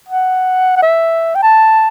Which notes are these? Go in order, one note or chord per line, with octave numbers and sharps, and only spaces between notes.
F#5
F#5
E5
G5
A5